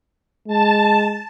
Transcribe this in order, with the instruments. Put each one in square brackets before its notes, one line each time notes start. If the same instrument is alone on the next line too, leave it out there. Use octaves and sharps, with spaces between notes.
[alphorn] G#3 [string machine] A5